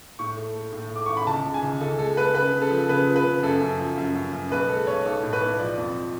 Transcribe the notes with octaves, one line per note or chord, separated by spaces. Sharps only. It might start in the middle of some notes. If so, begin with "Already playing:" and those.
A2 C#6
A3
A3
A2
A3
D6
A1 C#6
B5
C#2 A5
C#3
G#5
C#2
C#2 A4
G#3 A4
G#3 B4
C#3 B4
C#3
A4
F3
C#3 B4
F3
B4
C#3
F#2 A4
F#2
F3
F#2
F#2
F#2
B1 B4
G#3 A4
B1 C#5
B1 A4
A2
B4
B1
F3 D5
F2